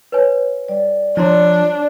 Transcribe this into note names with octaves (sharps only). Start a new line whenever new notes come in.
B4 C#5 G#5
G3 D5
F3 D4 C#5 A#5 C6